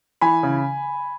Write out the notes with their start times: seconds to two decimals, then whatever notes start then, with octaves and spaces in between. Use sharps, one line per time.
0.21 E3 G#5 B5
0.43 C#3